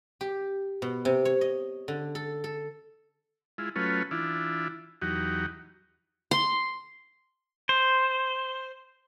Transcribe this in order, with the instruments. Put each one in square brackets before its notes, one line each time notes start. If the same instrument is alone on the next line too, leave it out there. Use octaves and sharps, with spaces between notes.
[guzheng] G4
B2
C3
C#5
D#5
D3
A4
A4
[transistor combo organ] G#3 E4 F4
F#3 A3 C#4 F4 B4
E3 D4 E4 F4
E2 F#3 D#4 F#4 G4
[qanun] C6
[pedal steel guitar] C5